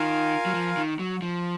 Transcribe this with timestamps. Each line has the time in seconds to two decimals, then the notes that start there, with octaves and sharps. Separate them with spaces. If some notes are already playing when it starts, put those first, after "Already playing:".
Already playing: D#3 F4 A#4 F5 G#5
0.46 F#3
0.54 F3
0.77 D#3
0.99 F#3
1.22 F3